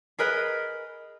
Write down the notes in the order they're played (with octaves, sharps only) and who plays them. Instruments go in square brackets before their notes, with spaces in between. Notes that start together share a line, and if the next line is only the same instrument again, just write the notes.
[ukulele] G#4 A#4 B4 D#5